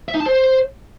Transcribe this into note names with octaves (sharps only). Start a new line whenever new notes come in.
E5
D#4
A5
C5